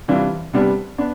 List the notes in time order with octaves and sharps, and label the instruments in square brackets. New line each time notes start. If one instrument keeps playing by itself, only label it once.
[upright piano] C3 E3 G3 D4 F4
C3 G3 B3 D4
B3 D4